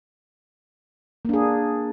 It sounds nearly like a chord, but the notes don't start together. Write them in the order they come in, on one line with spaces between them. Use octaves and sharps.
A#3 D4 G#4